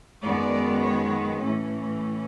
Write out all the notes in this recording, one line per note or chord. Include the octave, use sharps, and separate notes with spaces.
F#2 D#3 G#3 B3 D5
C#5
A2 E3 A3 C#4